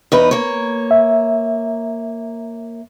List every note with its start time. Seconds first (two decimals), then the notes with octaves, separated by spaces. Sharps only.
0.12 E2 D#4 B4
0.31 A#3 C#5
0.91 E5